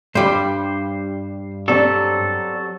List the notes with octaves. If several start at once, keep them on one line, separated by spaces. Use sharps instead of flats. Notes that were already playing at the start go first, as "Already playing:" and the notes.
G2 G3 C5
F#3 C4 G4 A4 D5